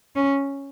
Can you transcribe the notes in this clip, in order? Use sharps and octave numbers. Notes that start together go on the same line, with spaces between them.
C#4